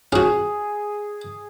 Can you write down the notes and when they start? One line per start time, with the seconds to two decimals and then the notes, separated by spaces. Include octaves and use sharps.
0.12 C#4 F#4 G#4